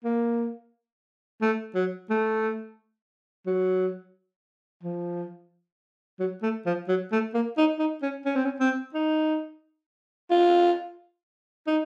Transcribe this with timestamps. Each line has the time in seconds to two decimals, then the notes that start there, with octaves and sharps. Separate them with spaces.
0.05 A#3
1.42 A3
1.75 F#3
2.10 A3
3.47 F#3
4.83 F3
6.20 F#3
6.43 A3
6.66 F3
6.88 F#3
7.12 A3
7.34 A#3
7.58 D#4
7.79 D#4
8.03 C#4
8.25 C#4
8.36 C4
8.46 C#4
8.60 C4
8.94 D#4
10.31 F4
11.67 D#4